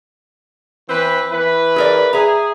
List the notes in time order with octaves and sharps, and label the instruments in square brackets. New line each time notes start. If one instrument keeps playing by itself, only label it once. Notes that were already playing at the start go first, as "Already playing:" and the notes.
[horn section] E3 C4 B4
E3 E4 B4
[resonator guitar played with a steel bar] G#4 A#4 D5
[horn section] G#4 [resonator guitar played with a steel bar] E5 A#5